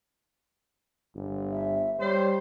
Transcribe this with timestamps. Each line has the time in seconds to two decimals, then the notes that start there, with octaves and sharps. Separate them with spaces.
1.15 G1
1.51 E5
2.00 G3 C5 C#5